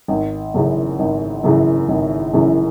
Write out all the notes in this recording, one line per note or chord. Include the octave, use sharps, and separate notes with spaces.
G#1
F#2 C#3 E3
G#1
F#2 C#3 E3
G#1
F#2 C#3 E3